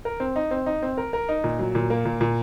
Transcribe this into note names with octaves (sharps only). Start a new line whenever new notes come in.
A#4
C4
D#4
C4
D#4
C4
A#4
A#4
D#4
A#2
F#3
A#2
A#3
A#2
A#2